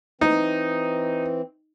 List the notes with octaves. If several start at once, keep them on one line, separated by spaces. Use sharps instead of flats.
E3 C4 D#4